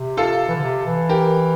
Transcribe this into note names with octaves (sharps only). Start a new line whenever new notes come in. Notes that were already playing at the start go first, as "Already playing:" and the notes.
Already playing: C3
F4 A4
E3
D3
C3
E3
G4 A#4